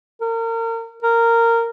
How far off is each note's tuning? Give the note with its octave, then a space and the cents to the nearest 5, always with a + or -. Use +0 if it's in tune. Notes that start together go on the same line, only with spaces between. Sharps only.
A#4 -35
A#4 -15